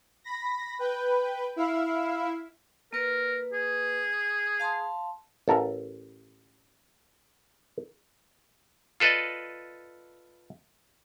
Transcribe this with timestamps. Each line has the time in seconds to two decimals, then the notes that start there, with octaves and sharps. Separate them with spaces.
0.24 B5 A#6
0.79 B4 G5
1.56 E4 E5 F5
2.93 A#3 A#4 B4
3.53 G#4
4.60 F5 A5 C6
5.48 A1 A4 A#4 E5
9.00 F4 A4 B4 D5 D#5